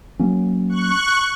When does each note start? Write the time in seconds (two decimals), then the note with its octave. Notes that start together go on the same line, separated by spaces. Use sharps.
0.19 F#3 A#3 C#4
0.69 C#6 F#6